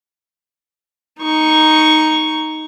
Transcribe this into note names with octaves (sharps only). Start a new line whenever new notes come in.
D#4 C#6